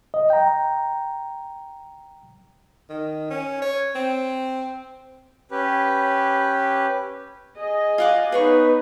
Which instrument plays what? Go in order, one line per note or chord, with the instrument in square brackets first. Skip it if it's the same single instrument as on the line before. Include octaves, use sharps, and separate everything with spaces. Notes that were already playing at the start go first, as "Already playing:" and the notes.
[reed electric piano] D#5
G5 A#5
[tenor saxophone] D#3
C#4
C#5
C4
[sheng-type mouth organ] C#4 G4 B4
[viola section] G#4 D#5
[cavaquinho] F4 F#5 D6
[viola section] B3 D#4 [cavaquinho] G#4 C#5 C#6 [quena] B4